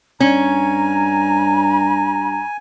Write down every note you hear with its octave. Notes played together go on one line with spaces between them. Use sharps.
G2 C#4 G#5 A#5